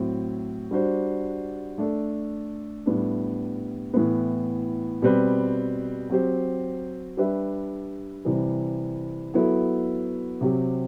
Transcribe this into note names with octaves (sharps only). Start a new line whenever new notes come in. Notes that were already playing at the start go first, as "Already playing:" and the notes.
Already playing: A2 F#3 C4
G3 D4 F#4 C5
A3 D4 A4
A2 G3 B3 D4
A2 E3 B3
B2 G3 C4 G4 B4
F#3 C4 G4 C5
G3 D4 G4 B4 E5
C3 E3 G3
F#3 B3 E4 A4
C3 F#3 C4 G4